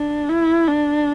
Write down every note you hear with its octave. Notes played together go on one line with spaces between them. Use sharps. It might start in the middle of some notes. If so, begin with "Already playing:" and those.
Already playing: D4
E4
D4